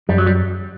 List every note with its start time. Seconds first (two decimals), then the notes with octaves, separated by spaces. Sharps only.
0.09 F#2 G3
0.18 F#3
0.26 G3